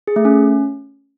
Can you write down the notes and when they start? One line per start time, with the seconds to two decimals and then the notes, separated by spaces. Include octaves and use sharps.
0.07 G#4
0.16 A3
0.25 C#4